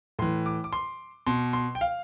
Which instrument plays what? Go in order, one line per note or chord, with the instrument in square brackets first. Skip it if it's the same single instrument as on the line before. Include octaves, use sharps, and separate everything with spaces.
[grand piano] A2 E3 C6
D6
D6
C6
B2 C6
C6
G5
F5